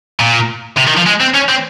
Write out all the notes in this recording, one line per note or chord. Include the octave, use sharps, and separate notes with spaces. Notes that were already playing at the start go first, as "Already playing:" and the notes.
A#2
C3
D#3
F3
G#3
C4
C#4
C4